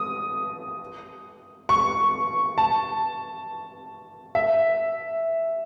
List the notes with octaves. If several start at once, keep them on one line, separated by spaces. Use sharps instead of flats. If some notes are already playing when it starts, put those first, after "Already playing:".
Already playing: D#6
C#6
A5
E5